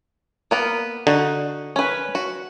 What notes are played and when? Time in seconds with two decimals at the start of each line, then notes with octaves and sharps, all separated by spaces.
0.51 A#3 B3 A#4
1.07 D3 D#4 F#4
1.76 C#4 B4
2.15 F#4